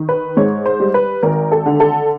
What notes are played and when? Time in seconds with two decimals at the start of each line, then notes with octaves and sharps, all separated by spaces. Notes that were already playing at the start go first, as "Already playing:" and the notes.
Already playing: D#3
0.09 B4
0.37 G#2 C#5
0.66 C5
0.80 G3
0.94 B4
1.23 G#1 A#4
1.52 A4
1.66 D3
1.80 A4